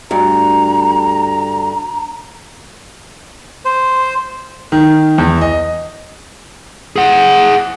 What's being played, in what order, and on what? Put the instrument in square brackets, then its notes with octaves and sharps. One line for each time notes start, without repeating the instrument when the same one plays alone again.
[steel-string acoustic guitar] D2 G2 [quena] A#5
[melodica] C5
[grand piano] D#3
E2
D#5
[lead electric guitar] G#4 F#5